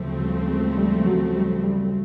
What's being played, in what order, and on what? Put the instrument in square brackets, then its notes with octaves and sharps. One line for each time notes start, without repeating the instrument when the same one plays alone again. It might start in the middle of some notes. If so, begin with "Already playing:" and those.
Already playing: [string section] D2 C#3 F3 A3 C4 [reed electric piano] F#3
[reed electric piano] G3
G#3
G3
F#3
G3
G3